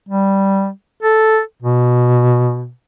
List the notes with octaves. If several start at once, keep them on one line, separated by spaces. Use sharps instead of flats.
G3
A4
B2